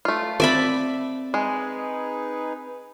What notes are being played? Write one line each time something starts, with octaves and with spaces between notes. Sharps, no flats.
A3 F4
C4 D5 E5 B5
G#3 D#4 G#4 B4